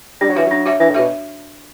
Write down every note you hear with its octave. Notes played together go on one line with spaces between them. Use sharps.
G3 D4
F#3
E3 F#4 C#5 E5
F#3 D4
F#4 C#5 E5
E3 D4
A2
B2 F#4 C#5 E5